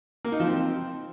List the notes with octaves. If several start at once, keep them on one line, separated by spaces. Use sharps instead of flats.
A#3
D#4
F3
C4